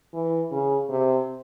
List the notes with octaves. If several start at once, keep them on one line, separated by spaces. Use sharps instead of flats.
E3
C#3
C3